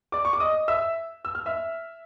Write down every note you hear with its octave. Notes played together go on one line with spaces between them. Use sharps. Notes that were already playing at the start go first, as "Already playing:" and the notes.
D5 D6
C#6
D6
D#5 D#6
E5 E6
E6
F6
E5 E6